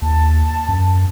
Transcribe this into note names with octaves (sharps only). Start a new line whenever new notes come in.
D#2 A5
F#2